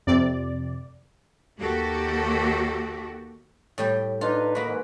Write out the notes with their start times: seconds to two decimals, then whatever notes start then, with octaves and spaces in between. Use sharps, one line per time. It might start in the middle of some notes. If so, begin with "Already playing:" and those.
0.07 F2 C3 D5
1.59 D#2 A#3 F#4 G4 A4
3.78 A2 G3 G5
4.21 D4 D#4 F4 B4
4.55 A#3 F#4 D#5 B5
4.68 G#2 E3